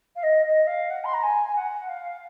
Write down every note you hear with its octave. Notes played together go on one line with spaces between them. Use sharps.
F5
D#5
D#5
F5
F#5
C6
A#5
G#5
F#5
F5